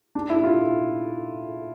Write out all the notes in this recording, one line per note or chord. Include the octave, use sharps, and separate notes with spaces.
D4
E4
F4